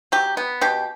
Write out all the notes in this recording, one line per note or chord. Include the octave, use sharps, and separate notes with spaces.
F#3 G4
B3
B2 G4